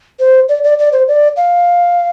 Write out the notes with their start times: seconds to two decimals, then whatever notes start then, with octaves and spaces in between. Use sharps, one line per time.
0.20 C5
0.49 D5
0.64 D5
0.79 D5
0.93 C5
1.08 D5
1.37 F5